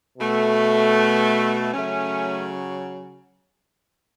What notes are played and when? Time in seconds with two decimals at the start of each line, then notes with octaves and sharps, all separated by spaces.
0.18 B2 A3
1.72 C#3 F#3 A3 C#4